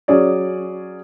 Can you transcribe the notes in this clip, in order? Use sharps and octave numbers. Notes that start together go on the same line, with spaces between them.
F#3 C#4 G#4 C#5 D5